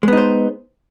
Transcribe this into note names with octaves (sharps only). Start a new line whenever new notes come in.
G#3 B3 D#4 C5